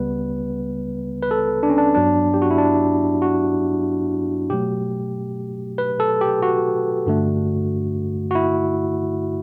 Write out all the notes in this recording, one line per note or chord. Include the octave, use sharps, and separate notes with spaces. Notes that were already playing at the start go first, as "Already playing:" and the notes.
Already playing: C#2 C#3 G3 B3 B4
B4
A4
D4
C#4
D4
G2 F#3 B3 D4
G4
F#4
E4
D4
F#4
B2 F#3 A3 G4
B4
A4
G4
F#4
G2 D3 A3
F#4
E4